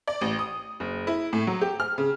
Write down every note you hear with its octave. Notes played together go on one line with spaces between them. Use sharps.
D5
A1
D#6
F#1
E4
A2
F#3
G4
F6
C#3